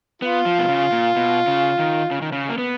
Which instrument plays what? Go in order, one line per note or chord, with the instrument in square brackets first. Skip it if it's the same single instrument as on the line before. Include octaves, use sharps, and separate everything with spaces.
[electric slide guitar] B3 [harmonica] F4
[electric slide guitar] F3
B2
C#3
A#2
B2
C#3
D#3
C#3
D#3
C#3
A#3
B3